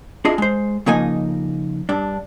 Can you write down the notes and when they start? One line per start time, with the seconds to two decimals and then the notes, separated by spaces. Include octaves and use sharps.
0.25 D4 E4 F4 G#4 D#5
0.38 G#3 C5
0.86 C#3 F3 A#3 D#4 D#5 G#5
1.89 G2 D4